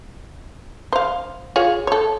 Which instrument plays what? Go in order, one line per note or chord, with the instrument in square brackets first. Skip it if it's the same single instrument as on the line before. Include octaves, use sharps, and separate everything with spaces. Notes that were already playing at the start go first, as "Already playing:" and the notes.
[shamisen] C5 F5
F4 G#4 C#5
A4 C#5